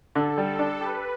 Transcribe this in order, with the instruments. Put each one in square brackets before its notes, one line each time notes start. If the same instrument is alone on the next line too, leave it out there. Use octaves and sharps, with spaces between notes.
[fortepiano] D3 [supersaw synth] A4
[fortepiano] G3
D4
[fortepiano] G4 [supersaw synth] B4